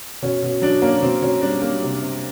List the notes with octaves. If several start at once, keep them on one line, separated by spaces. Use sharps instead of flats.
B2 C#4
B2
F#3 D4
A#3 C#4
B2 C4
B2 C#4
G3 D4
A#3
C3
C3